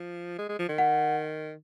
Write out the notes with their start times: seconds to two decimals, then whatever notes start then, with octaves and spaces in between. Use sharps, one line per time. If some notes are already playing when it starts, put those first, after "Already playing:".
Already playing: F3
0.38 G#3
0.49 G#3
0.59 F3
0.69 D#3
0.78 F#5